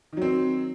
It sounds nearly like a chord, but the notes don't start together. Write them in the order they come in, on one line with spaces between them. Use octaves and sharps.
D#3 F#3 C4